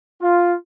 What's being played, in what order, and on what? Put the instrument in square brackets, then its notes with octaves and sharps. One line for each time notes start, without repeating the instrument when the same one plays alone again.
[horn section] F4